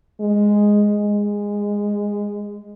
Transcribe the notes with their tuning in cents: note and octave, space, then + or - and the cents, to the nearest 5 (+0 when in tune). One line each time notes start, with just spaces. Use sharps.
G#3 -5
G#3 -15